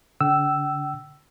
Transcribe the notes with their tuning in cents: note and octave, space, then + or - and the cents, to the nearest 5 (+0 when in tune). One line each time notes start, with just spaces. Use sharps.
D3 -35 G5 -40 E6 +5